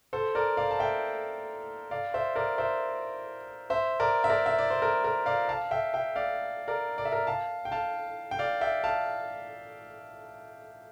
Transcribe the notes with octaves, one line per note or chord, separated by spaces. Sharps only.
A4 C5
A#4 D5
D5 F5
A5
E5 G5
D5 F5
C5 E5
A#4 D5
C5 E5
C5 E5
A#4 D5
E5
A#4 D5
E5
D5
C5
A#4
A#4
D5 F5
F5 A5
E5 G5
E5 G5
D5 F5
A#4 D5
D5
E5
A#4 D5
F5 A5
G5
F5 A5
G5
D5 F5
E5 G5
F5 A5